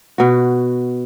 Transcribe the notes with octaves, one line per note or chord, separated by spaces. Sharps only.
B2 F#4